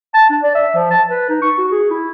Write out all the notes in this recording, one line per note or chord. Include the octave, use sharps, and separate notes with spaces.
A5
D4
D5
E5
F3
A5
B4
D#4
C#6
F#4
G#4
E4